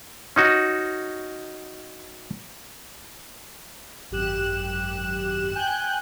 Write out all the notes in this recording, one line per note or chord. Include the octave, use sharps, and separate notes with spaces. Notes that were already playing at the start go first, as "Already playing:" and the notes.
C#4 D#4 F#4
G#1 F#2 G4 F#6 E7
G5 G#5 F#6 G6